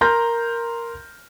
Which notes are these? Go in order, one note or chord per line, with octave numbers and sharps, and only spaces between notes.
A#4 A#5 C6 F6 G6 A#6